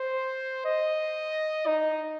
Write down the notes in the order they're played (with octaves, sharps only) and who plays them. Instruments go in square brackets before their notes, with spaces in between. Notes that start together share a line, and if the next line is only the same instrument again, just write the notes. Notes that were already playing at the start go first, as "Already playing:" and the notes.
Already playing: [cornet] C5
D#5
D#4